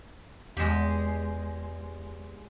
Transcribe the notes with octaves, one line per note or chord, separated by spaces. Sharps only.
E2 G#3 G4